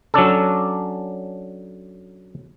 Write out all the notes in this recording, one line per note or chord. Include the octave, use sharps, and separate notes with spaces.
F#3 C#4 D4 A4